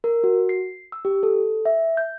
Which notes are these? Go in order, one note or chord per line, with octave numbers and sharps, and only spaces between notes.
A#4
F#4
C7
E6
G4
A4
E5
G6